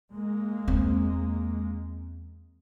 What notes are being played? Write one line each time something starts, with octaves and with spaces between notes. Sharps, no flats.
G#3 A#3
E2 C4